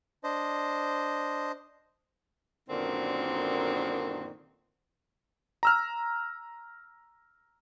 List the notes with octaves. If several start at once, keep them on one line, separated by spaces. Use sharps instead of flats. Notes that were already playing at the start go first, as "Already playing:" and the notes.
D4 C5 D#5
F#2 A#2 D3 D#3 B3 C4
A#5 E6 F6